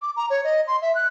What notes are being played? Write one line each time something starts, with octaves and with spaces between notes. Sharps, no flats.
D6
A#5
C#5
D#5
C6
E5
F#6